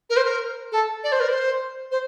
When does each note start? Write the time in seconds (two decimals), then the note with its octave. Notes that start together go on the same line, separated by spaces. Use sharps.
0.09 A#4
0.16 C5
0.24 A#4
0.71 A4
1.03 D5
1.12 C5
1.20 A#4
1.28 C5
1.91 C5